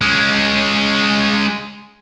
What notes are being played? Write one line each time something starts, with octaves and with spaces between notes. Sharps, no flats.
G#3 C#4